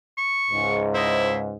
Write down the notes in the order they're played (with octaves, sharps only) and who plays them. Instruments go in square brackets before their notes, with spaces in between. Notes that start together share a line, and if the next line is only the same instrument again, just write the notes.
[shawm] C#6
[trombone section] C#2 G#2
[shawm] E4 [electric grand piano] C5 D#5